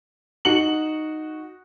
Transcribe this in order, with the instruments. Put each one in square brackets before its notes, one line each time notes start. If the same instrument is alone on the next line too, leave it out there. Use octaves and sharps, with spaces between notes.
[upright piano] D#4 F#4 C#7 F#7